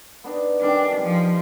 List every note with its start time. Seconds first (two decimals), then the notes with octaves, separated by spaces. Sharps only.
0.24 B3 D4 D#4
0.61 D#3 G3 C#4 D4
1.03 F3